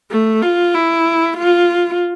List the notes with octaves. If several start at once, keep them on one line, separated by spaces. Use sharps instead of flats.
A3
F4
E4
F4